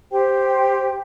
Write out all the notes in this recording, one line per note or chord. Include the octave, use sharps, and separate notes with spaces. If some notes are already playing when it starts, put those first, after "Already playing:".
G4 C5 G5